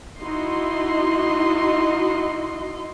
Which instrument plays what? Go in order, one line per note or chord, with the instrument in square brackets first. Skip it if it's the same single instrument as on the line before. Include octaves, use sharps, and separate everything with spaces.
[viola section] D#4 E4 F#4 D#5 C6